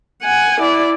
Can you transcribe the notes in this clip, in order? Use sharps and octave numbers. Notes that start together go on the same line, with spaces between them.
F#5 G#5
E4 D5